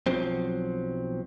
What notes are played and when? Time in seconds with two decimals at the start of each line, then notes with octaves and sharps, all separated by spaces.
0.07 B1 F3 F#3 C4